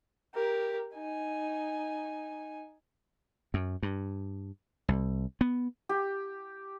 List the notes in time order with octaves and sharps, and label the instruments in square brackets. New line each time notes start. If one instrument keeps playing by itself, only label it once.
[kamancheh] G4 A#4
D#4 G#5
[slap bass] F#2
G2
C2
B3
[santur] G4